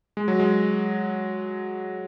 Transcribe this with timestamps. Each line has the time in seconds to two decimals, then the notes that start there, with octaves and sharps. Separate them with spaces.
0.17 G#3
0.28 F#3
0.40 G#3